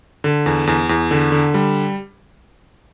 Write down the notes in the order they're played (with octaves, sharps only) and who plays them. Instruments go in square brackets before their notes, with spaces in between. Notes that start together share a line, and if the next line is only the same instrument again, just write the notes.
[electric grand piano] D3
E2
E2
E2
D3
D3
G3